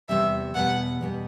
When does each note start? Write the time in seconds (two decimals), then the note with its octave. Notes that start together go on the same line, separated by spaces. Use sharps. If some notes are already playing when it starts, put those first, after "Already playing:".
0.09 E2 C3 G3 E5
0.55 E2 B2 G3 B3 F#5
1.01 E2 B2 G3 B3